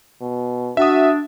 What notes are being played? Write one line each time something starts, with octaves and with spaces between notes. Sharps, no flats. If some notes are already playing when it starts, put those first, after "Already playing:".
B2
D4 F#4 E5 D#6